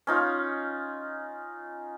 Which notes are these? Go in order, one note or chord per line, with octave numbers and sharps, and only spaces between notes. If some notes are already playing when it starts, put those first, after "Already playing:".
C#4 D#4 F4